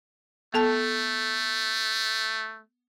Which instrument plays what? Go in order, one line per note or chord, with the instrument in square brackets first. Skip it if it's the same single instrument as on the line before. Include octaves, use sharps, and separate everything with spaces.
[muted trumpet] A3 [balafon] B3 A4 A5